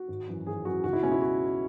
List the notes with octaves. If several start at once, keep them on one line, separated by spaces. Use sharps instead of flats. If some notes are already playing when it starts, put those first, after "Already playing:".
Already playing: F#4
G#1
F#2 E3
G#1 G#4
F#2 E3 F#4
C#2 F#4
E4
B2 G#3 C#4
E4
F#4